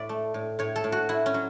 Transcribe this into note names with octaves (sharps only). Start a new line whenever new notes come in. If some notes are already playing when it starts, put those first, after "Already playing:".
Already playing: A2 D5 E5
A3
A2
A2 C#5
A4
A2
F#4
A2 E4
C#4
F#3